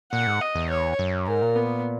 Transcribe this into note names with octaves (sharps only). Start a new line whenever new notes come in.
A#2 F#5
G#2
D#5
E2
C#5
F#2
G#2 A#4
A#2
B3